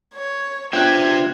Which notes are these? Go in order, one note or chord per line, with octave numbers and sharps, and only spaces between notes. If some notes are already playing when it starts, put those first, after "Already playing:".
C#5
B3 D4 F4 C5 E5 G5 F#6 G#6